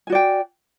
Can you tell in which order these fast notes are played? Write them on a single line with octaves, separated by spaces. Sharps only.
G#5 F#4 D5 G5